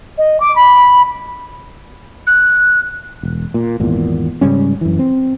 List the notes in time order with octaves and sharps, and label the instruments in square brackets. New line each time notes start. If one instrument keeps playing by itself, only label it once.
[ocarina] D#5
D6
B5
[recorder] F#6
[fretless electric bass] E1
A#2
G#1 E2 A#2
G#2 C#3 G3 C#4
F#2 E3
C4